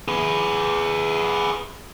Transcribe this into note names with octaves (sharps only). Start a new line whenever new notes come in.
G#4 B4